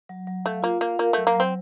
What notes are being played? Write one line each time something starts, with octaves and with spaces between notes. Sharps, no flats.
F#3
F#3
A3 F5
A#3 F4
A#3 F5
A#3 A#4
F#3 A3
A#3
F#3 C4